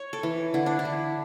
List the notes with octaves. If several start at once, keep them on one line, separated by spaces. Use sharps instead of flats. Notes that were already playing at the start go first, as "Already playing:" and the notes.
Already playing: C#5
A4
E3
D3 E4
D4
E4
D3